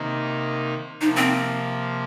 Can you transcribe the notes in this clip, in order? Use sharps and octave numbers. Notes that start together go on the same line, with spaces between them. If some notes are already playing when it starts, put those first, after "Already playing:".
Already playing: C3 D#3 A#3 D#4
C3 F3 A#3 D#4
C4